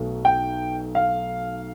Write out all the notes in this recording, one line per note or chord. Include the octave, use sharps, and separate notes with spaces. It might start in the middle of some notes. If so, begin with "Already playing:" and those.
Already playing: B1 B2 A3
G5
F5